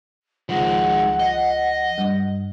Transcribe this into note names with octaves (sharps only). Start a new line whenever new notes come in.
C#2 D#3 F3 G#3 F#5
D#5
G2